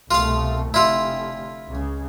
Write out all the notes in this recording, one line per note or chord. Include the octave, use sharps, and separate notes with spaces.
C2 B2 A3 F4 F5
F1 D3 E4 F4
C#2 C#3